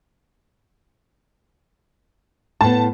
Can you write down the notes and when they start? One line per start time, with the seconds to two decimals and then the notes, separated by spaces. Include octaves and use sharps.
2.61 A2 B3 A5